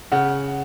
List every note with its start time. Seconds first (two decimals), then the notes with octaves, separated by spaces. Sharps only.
0.12 C#3 F#5